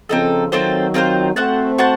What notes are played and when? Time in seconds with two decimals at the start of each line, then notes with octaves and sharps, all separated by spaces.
0.09 C#3 F3 C4 D#4 A4
0.51 D#3 F#3 C4 F4 A4 C5
0.94 C4 F4 A4 C5
1.36 A3 C4 F#4 C5 F#5 A5
1.78 F#4 C5 F#5 A5